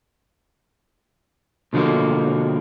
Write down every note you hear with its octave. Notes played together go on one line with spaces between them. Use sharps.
B2 D3 F3 G#3 A#3